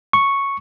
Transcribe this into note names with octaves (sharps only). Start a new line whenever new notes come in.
C#6